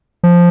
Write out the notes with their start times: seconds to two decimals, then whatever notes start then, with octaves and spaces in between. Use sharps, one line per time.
0.23 F3